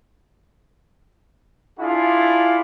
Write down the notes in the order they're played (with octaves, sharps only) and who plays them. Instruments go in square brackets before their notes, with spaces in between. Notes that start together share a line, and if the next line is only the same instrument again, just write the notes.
[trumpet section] D4 E4 F4 G#4